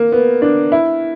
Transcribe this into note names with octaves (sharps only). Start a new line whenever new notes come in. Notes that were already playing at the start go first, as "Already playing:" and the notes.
Already playing: A#3
B3
D4
E4